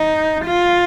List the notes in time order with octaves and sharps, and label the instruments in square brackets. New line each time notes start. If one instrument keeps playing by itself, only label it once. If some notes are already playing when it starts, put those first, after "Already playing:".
Already playing: [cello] D#4
F4